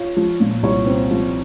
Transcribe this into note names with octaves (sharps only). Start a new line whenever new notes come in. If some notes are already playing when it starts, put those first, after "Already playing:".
Already playing: F4 C#5
F3
A#2
C2 C#5
C4
F3